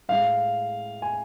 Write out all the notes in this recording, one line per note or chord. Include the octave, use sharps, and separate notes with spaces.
A2 G#3 F5
G#5